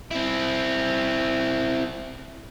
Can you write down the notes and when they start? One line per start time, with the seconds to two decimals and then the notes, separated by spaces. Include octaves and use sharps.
0.11 C4 E4